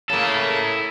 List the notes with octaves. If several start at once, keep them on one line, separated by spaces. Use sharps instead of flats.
C#3 A#3 E4 A4